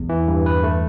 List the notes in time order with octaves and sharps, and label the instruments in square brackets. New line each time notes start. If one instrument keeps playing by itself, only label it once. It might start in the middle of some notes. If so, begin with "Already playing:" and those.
Already playing: [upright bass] E2
[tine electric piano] E3
G2
B4
A3